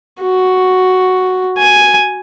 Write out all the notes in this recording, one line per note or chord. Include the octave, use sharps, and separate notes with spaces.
F#4
G#5